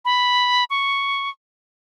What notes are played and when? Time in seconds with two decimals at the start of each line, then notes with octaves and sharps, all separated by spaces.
0.05 B5
0.70 C#6